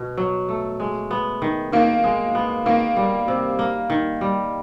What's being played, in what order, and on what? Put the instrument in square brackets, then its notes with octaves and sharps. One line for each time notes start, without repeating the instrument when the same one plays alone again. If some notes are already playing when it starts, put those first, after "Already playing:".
Already playing: [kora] B2
F#3
A3
G#3
B3
D#3
[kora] D#3 [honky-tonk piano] A#3
[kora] G#3
B3
[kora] D#3 [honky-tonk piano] A#3
[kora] G3
C3
A#3
D#3
G3